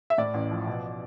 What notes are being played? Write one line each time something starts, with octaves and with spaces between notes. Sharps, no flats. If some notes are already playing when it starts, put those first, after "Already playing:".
E5
A2 D5
A1
F3
B2